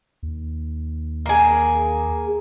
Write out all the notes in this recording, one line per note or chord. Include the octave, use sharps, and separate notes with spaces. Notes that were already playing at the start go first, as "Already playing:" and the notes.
D#2
A#3 G#4